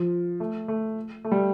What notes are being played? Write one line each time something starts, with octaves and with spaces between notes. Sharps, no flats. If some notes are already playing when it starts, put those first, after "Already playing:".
Already playing: F3
A3
A3
A3
G3